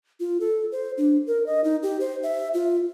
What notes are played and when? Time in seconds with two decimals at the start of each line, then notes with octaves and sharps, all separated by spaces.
0.20 F4
0.40 A4
0.72 C5
0.98 D4
1.27 A#4
1.46 D#5
1.64 D#4
1.83 G4
2.00 C5
2.23 E5
2.54 F4